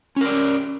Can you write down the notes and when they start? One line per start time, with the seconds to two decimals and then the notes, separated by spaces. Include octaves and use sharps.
0.16 C#4
0.21 A#4
0.25 D5